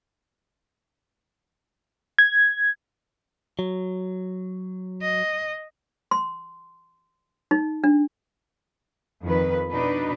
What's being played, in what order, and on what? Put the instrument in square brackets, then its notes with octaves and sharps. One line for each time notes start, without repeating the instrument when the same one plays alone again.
[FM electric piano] G#6
[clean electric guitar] F#3
[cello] D#5
[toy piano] C6
D#4
D4
[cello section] F2 D#3 B4
B2 D4 D#4 B4